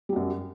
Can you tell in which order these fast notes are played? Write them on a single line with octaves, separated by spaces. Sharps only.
G3 F#3 F#2